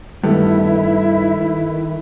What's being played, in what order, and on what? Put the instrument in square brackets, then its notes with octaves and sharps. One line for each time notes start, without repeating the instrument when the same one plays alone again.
[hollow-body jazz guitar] G2 [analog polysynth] D#3 [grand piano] A3 B3 [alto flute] E4